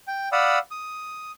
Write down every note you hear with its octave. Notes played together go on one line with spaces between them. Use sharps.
G5
D5 F5 F#5 B5 D#6 E6
D#6